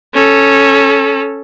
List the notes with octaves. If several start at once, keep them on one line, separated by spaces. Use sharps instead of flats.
C#4 A4